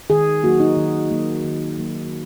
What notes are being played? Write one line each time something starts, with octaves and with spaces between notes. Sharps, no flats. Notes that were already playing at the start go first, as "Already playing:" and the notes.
D#3 G#4
F#3 A#3 F#4
D#4
D#3
F#3 A#3
D#3
F#3 A#3